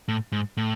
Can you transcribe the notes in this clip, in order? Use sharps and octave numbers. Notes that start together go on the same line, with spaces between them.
A2
G#2
A2